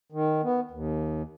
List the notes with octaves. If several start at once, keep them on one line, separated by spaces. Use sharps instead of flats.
D#3
B3
D#2